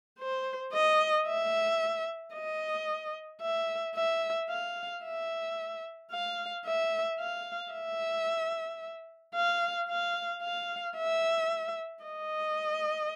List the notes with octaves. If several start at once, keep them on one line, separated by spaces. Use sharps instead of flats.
C5
D#5
E5
D#5
E5
E5
F5
E5
F5
E5
F5
E5
F5
F5
F5
E5
D#5